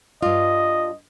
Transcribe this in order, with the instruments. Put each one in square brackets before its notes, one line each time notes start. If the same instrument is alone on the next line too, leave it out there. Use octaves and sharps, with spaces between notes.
[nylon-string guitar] G2 F4 [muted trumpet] D#5